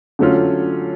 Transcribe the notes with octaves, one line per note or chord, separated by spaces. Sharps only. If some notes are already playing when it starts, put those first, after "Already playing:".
D3 F#3 A3 C#4 F4